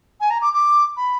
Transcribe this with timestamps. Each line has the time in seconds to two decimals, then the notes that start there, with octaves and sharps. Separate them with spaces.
0.20 G#5
0.30 A#5
0.42 D6
0.53 D6
0.97 B5